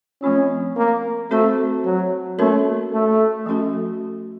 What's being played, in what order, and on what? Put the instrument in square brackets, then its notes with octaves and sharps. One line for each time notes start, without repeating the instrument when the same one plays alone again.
[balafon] F3 A3 C4 F4 [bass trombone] C#4
[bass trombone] A#3
[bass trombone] A3 [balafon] C4 F#4 A4 C5
[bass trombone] F#3
[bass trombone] A3 [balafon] A#3 C#4 F#4 A#4 C#5
[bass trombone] A3
[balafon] F3 A3 C#4 F#4 A4